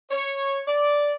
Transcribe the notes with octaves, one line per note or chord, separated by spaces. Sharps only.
C#5
D5